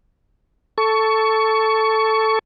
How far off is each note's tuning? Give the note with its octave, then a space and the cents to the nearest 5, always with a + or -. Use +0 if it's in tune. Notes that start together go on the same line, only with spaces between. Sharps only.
A4 +0 C#6 +15